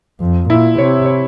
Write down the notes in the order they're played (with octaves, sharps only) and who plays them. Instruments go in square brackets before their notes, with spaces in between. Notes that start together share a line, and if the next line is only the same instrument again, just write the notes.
[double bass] F2
[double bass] A#2 [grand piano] E4
[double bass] C3 [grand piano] C#5
[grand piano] C#5